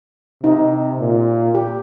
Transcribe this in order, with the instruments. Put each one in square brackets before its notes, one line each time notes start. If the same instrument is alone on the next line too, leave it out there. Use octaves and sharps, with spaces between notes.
[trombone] C3 [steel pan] D#4
[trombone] A#2
[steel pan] G4